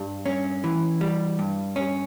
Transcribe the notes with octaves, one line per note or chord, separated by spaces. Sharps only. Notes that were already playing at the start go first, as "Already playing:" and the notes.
Already playing: G2 G3
C#4
E3
G3
G2
C#4